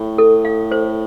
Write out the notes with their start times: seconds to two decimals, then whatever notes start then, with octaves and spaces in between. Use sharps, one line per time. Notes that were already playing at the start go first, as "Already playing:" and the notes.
Already playing: A2
0.18 A4
0.45 F5
0.71 C5